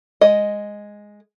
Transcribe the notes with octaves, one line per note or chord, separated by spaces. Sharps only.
G#3 D#5